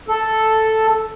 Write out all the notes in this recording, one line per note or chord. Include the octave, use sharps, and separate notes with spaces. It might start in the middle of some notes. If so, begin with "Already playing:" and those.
A4